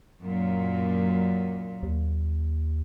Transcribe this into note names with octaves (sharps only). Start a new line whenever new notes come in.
F#2 A#2
D#2